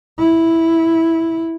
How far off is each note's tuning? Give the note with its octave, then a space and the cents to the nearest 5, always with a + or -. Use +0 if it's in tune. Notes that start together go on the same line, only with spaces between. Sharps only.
E4 -5